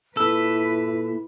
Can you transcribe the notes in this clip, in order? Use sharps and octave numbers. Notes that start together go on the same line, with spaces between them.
A#2 E4 A4 B4 E6